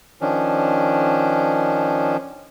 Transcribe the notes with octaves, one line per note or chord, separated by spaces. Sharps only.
D#3 F3 C#4 D4